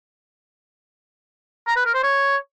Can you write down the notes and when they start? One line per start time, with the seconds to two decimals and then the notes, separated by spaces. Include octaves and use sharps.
1.67 A#5
1.76 B4
1.85 A#4
1.94 C5
2.03 C#5